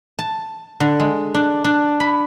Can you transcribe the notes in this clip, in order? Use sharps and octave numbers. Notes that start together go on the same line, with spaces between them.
A5
D3
G#3
D4
D4
B5